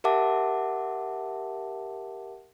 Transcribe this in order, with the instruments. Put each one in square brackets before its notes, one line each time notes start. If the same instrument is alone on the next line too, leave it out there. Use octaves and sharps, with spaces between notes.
[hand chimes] G4 A#4 E5 F#5 A5 D6